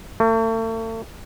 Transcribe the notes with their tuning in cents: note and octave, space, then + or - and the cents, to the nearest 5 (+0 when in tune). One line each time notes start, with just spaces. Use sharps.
A3 +40